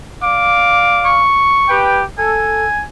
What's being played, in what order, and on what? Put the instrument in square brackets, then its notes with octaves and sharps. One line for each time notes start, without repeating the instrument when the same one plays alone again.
[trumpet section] D5 F5 D6
[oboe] C#6
[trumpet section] G4 B4 G5
[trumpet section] A4 [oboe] G#5